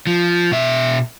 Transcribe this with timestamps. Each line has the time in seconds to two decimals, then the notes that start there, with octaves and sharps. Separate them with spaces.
0.07 F3
0.52 B2 E5